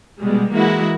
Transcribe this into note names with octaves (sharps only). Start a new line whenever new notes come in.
B2 G3 G#3
E3 G#3 A#3 E4 F#4